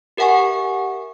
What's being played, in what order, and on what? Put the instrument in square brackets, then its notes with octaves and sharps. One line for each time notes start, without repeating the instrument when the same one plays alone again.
[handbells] G4 A#4 E5 F#5 G#5 C#6